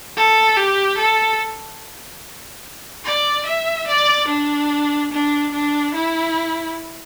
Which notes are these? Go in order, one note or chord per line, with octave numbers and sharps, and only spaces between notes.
A4
G4
A4
D5
E5
D5
D4
D4
D4
E4